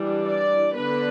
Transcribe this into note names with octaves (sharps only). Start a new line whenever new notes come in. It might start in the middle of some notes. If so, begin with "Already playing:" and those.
Already playing: E3 G3 D4
D5
D3 B3 D4 B4